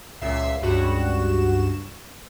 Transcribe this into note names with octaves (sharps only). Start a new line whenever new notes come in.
C#2 A#2 E5 C7
C#2 G2 F#4 E7